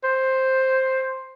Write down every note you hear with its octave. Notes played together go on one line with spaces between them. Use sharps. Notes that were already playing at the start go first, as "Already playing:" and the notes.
C5